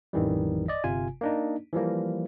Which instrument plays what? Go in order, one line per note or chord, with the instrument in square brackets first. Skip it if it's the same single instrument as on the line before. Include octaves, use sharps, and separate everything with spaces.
[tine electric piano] A1 F2 D#3 E3 G3
D5 D#5
G1 C3 F4 G#5
A#3 D4 D#4
E3 F3 G3 A#3